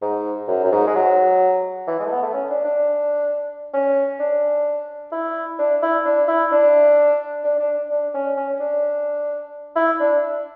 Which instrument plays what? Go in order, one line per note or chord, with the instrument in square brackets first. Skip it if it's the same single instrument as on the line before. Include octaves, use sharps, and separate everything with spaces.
[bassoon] G#2
F#2
F#2
G#2
G#3
F#3
E3
G#3
A3
B3
A3
C#4
D4
D4
C#4
D4
E4
D4
E4
D4
E4
D4
D4
D4
D4
C#4
C#4
D4
E4
D4